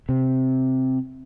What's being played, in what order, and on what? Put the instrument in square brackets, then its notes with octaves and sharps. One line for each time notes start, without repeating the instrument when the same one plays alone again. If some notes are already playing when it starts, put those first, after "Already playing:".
[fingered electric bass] C3